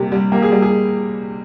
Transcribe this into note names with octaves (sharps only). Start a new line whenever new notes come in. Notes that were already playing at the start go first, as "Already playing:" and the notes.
Already playing: C3 G3 A#3 G4
G3
A#3 G4
G#4
G3
G#4